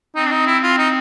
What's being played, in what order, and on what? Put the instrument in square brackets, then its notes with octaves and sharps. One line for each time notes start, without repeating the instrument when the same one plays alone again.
[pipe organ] C4 [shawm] D#4
[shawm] D4
D#4
E4
F4
D#4